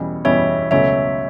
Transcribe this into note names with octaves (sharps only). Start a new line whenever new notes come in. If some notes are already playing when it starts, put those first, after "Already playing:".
Already playing: E2 B2 G3 C#4
E2 B2 G3 C#4 C#5 E5
C#2 B2 F#3 A3 C#4 C#5 E5